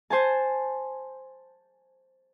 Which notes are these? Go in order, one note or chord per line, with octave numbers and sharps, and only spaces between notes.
C5 G#5 A5